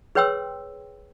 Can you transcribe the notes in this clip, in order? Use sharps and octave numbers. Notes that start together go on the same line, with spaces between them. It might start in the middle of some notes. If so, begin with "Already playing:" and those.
G#4 B4 C#5 G5 C6 E6